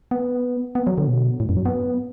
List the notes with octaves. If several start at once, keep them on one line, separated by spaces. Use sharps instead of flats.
B3
B3
F#3
D3
B2
A2
F#2
F#3
B3